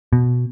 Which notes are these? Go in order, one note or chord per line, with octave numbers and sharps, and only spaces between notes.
B2